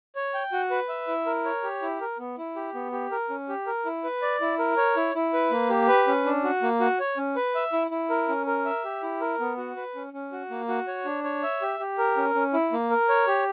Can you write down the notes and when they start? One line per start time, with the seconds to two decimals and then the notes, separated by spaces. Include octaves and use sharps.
0.16 C#5
0.34 G5
0.52 F#4
0.70 B4
0.89 E5
1.08 E4
1.26 A#4
1.45 C#5
1.63 G4
1.82 E4
2.01 A#4
2.19 B3
2.38 E4
2.56 G4
2.74 B3
2.92 G4
3.11 A#4
3.30 C#4
3.49 G4
3.66 A#4
3.85 E4
4.04 B4
4.22 D5
4.41 E4
4.59 A#4
4.77 C#5
4.96 E4
5.15 E4
5.33 B4
5.51 A#3
5.70 G4
5.88 B4
6.07 C#4
6.26 D4
6.44 F#4
6.62 A#3
6.80 F#4
7.00 C#5
7.17 C#4
7.36 B4
7.55 E5
7.73 E4
7.91 E4
8.10 A#4
8.29 C#4
8.46 A#4
8.65 E5
8.84 G4
9.03 E4
9.21 A#4
9.40 B3
9.57 F#4
9.77 B4
9.95 C#4
10.13 C#4
10.32 F#4
10.50 A#3
10.69 F#4
10.88 C#5
11.05 D4
11.24 C#5
11.43 E5
11.62 G4
11.80 G4
11.98 A#4
12.17 C#4
12.35 C#4
12.54 E4
12.72 A#3
12.90 A#4
13.09 C#5
13.27 G4